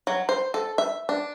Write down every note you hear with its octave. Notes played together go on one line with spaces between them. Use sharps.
F#3
C5
A4
E5
D4